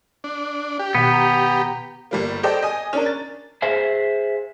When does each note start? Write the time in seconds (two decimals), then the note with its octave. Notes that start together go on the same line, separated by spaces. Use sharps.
0.24 D4
0.79 G4
0.95 B2 D#3 B3 F#5
1.12 A#5
2.11 G1 G3 A#3
2.43 G4 A4 C5 D5 D#5 G5
2.62 D#5 G#5 D#6
2.93 C#4 D4 A#4
3.06 A6
3.62 G#4 C5 E5 F5 G#5